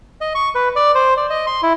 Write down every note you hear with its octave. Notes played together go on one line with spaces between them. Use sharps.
D#5
C#6
B4
D5
C5
D5
D#5
C6
E4